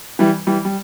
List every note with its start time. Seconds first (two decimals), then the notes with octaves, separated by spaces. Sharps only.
0.19 E3 G3
0.47 E3 G3
0.65 G3